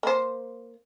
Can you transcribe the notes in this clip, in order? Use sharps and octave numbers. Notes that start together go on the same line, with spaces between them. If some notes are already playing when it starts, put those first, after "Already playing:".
A#3 C5